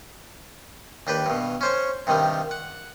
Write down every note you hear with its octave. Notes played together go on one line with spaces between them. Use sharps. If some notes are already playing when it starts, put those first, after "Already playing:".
D#2 D4 G4 B4
G2 B2
C#4 C5 C#5
G2 C3 D#3 G3
F#5